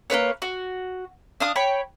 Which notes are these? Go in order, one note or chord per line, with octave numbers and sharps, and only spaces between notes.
A#3 D4 B4 C#5
F#4
D4 F5 D#6
C#5 G5 B5